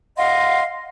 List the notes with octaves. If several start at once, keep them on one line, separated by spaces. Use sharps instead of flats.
D#5 F5 F#5 C6